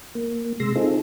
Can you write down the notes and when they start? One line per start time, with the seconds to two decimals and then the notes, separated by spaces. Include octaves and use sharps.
0.15 A#3
0.60 C3 G#3 C6 E6 A#6
0.75 C4 D#4 F4 G#4 A4